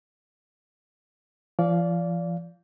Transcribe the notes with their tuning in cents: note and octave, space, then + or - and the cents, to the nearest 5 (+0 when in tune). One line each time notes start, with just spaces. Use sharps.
F3 -40 D5 -20 F5 +0